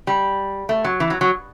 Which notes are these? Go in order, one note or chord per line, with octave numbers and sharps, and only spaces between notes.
G3
A3
F#3
E3
F#3
F#3